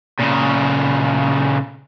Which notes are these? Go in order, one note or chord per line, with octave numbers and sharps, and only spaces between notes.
A#2 C#3